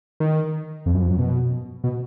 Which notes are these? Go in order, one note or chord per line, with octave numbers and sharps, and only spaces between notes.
D#3
F2
F#2
F2
F#2
B2
B2